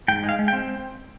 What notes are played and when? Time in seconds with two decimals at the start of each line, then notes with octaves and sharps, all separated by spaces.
0.08 G#2 G5
0.23 G#3
0.29 F5
0.39 G#3
0.48 G5
0.53 C4